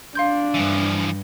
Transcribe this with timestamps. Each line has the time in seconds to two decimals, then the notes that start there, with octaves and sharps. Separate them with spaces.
0.15 D4 F5 C6 G6
0.54 G2 E3 F3